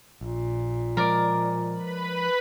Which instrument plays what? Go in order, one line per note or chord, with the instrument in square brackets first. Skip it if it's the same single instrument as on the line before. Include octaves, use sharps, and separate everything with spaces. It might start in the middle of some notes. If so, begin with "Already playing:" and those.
[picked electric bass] A#1 [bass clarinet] A#2
[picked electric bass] F3 G#3 [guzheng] A#4 D5
[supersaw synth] B4 B5